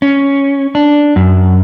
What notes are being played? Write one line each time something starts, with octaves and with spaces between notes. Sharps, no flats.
C#4
D4
F#2